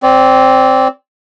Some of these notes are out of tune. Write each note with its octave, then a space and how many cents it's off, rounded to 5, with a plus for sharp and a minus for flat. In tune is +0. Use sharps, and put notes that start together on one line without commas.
C4 +0 D5 -25